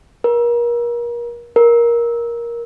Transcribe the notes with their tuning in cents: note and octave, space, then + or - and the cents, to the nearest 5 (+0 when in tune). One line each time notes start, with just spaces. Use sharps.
A#4 +35
A#4 +15